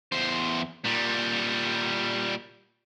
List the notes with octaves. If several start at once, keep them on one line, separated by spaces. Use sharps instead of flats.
E2 C5
A#2 G3